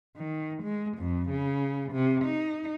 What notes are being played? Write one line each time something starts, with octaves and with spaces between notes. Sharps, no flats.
D#3
G#3
F2
C#3
C3
D#4